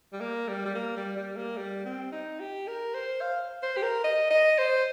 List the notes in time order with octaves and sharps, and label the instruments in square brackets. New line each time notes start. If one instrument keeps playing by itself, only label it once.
[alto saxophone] G3
A#3
G3
G3
A#3
G3
G3
A#3
G3
C4
D#4
G4
A#4
C5
F5
C5
G4
A#4
D#5
D#5
C5